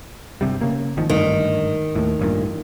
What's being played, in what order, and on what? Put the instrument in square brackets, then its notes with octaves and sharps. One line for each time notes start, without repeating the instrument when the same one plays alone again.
[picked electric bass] G1 C3 G3
C#3 A#3
G#1 D#3 F3
[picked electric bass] G#1 D2 G2 [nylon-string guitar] D#3
[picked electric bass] D#2 A2
A1 G2 A#2